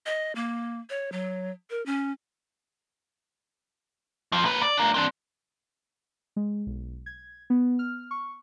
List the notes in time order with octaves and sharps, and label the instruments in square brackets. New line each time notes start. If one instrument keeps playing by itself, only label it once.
[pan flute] D#5
A#3
C#5
F#3
A#4
C#4
[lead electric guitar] F2 F3
A#3 B4
D5
D4 A#4
C4 D4
[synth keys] G#3
B1
G#6
B3
F6
C#6